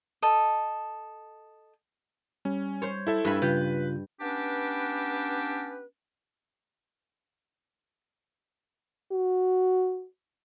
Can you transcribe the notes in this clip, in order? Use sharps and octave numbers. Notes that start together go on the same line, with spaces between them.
A4 D#5
G3 C#4
C5 C#5
E4 A4 E5
G2 G#5 B5
C#3 G3 F4 B4 G6
B3 C#4 D4 G4 B4
F#4